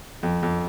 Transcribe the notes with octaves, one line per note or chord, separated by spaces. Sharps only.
F2
F2